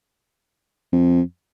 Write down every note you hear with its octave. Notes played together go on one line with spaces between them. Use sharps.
F2